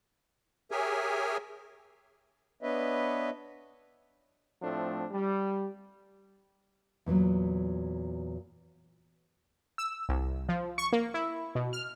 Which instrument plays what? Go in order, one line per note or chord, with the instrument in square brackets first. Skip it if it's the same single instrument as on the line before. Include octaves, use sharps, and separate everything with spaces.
[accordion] G4 G#4 A#4 C#5 E5 G#5
[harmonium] B3 D4 B4 C#5 D#5 E5
[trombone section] A2 F3 A3 C4 D4
G3
[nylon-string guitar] E2 A#2 F3 F#3
[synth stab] E6
C2
F3
C#6
A#3
E4
B2
F6